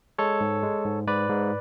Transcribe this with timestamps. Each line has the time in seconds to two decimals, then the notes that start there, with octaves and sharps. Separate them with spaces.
0.18 G#3 A4 C#5
0.41 G#2
0.63 G#3
0.85 G#2
1.08 G#2 B4 D5
1.29 G#2